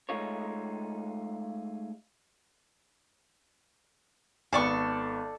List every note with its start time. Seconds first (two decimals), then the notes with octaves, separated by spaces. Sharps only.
0.09 G#3 A3 D#4 F4 C#5
4.53 G#1 B3 A4 D5 C#6